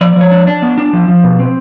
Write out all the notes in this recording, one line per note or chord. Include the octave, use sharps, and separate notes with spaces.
F3 D5
F3 C#5
D4
D4
B3
D4
F3
F3
B2
C4